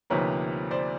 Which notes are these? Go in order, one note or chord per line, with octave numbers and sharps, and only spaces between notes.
D2 C3 F3 A#3 D#4 B4 C#5
C5 D5